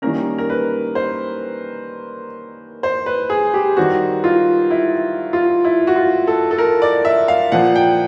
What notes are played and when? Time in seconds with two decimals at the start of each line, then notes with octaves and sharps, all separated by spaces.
0.02 D#3 G3 A#3 C#4 A#4
0.38 A#4
0.50 B4
0.95 C5
2.83 C5
3.06 B4
3.30 G#4
3.54 G4
3.77 D#3 G3 C4 F#4
4.24 F4
4.71 E4
5.33 F4
5.65 E4
5.87 F#4
5.96 F4
6.27 A4
6.51 A4
6.58 A#4
6.82 D5
7.05 E5
7.28 F5
7.52 A#2 F3 A#3 F#5
7.76 G5